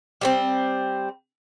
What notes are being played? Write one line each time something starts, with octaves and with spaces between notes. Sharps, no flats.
G3 B3 C4